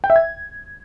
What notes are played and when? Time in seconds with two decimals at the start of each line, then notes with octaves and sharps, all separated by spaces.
0.04 G5
0.10 E5
0.16 G#6